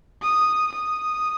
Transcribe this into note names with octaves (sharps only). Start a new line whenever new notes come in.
D#6
D#6